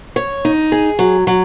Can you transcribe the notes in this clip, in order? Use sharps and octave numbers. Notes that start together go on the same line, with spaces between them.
C#5
D#4
G#4
F#3
F#3